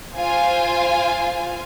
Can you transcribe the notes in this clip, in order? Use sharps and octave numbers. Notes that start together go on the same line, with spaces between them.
F4 C5 F5 G#5